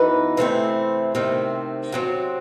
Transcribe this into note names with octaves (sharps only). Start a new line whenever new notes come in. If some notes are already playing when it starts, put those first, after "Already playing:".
Already playing: F#2 E3 B3 D#4 B4
C3 E3 A3 C4
C3 D#3 A3 C4
C3 F#3 C4